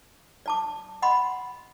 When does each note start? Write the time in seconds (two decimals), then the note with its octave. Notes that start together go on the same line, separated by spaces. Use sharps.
0.46 D5 A5 D6
1.02 D#5 F#5 B5 C6